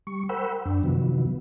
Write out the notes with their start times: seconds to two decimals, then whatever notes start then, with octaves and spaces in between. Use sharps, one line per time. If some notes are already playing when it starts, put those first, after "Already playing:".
0.07 G3 C#6
0.29 A#4 C5 F#5 G5 B5 E6
0.65 F#2 D4
0.83 C3 D#3 F3 F#3 B3